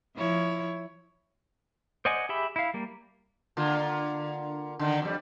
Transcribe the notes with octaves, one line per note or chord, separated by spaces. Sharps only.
F3 E4 C#5
C5 D5 D#5 F#5 G#5
G4 G#4 E5 B5
E4 F5
G3 A#3
D3 A#3 F4
D3 D#3
F2 G3